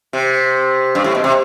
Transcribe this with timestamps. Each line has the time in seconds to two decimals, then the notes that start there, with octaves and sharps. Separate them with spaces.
0.13 C3
0.95 G2
1.04 A2
1.15 B2
1.24 C3